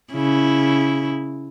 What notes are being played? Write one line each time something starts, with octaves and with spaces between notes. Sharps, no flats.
C#3 E4